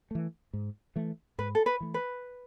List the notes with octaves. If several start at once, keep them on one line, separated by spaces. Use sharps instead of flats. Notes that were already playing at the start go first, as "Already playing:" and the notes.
E3 A3
G#2
E3 A3
G#2 B4
A4
B4
E3 A3
B4